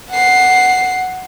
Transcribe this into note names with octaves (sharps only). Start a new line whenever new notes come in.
F#5 C7